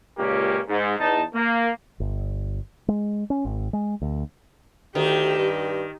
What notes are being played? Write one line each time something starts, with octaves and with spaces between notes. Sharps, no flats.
C#2 A#2 A#3 C#4 G4
G#2
E2 D#4 A5
A#3
G1
G#3
C#4
G#1
G#3
D2
D2 D#3 G4
G2